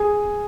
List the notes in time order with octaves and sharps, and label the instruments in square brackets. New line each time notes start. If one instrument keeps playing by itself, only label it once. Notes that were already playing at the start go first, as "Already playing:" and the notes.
Already playing: [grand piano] G#4 G#5